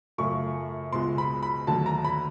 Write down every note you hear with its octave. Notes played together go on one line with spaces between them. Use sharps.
F#2 C#3 F3 A3 C#6
C#2 B2 G#3 C6
B5
B5
D#2 D3 F#3 A3 A5
A#5
B5